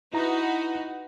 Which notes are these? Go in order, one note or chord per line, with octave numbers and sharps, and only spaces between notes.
D#4 E4 F#4 B4 A#5